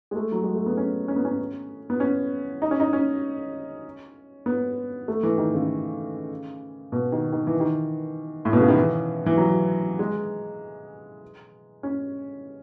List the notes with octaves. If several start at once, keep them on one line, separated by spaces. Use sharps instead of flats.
G#3
A3
F#3
G#3
A3
B3
C#4
C#4
B3
C#4
B3
C#4
D#4
C#4
D#4
C#4
B3
A3
E3
D#3
C#3
B2
D#3
D#3
E3
D#3
A2
B2
C#3
D#3
E3
E3
F#3
G#3
C#4